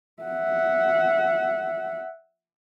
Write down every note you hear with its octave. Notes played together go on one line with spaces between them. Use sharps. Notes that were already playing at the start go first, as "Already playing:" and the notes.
E5 F#5